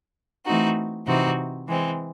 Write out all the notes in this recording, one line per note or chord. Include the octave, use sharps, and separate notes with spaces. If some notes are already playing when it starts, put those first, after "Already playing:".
E3 A3 C4 D#4 F#4
C3 E3 C4 D#4 F#4
E3 G#3 C4